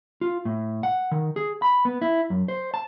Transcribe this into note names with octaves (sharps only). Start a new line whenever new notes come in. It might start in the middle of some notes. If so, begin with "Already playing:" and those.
F4
A2
F#5
D#3
G#4
B5
B3
E4
F#2
C5
A5